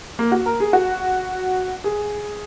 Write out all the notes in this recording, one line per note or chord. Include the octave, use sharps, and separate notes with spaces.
A#3
F#4
A#4
G#4
F#4
G#4